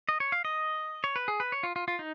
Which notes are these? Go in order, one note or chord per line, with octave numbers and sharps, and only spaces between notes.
D#5
C#5
F5
D#5
C#5
B4
G#4
B4
C#5
F4
F4
F4
D#4